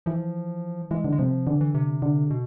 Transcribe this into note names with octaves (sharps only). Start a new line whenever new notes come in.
E3 F3
E3 G#3
D3
G#3
C3 F3
D3 E3
E3
C3
D3
B2